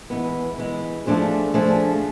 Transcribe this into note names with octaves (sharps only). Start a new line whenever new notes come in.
E3 G#3 B3
E3 G#3 B3
F3 A3 D4 G#4 C5
F3 A3 D4 G#4 C5